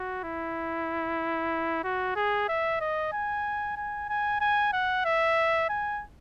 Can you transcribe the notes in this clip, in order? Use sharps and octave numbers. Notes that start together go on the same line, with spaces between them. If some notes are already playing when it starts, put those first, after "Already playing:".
Already playing: F#4
E4
F#4
G#4
E5
D#5
G#5
G#5
G#5
G#5
F#5
E5
G#5